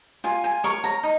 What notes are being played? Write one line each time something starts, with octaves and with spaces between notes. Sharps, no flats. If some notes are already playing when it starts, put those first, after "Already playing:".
F4 G#5
G#5
A#4 C#5 C#6
A#5
D#4